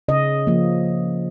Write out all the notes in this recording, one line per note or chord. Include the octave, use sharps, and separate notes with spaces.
C#3 D#5
F3 A#3